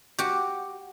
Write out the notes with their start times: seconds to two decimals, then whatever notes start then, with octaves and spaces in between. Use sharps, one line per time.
0.19 F#4 G4